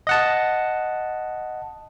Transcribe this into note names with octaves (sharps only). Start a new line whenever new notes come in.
D#5 F#5 A5